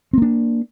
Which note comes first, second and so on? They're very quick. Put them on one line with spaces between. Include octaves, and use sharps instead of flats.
C4 A#3 D4